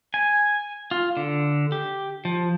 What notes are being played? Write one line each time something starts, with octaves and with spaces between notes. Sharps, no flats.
G#5
F4
D3
G4
F3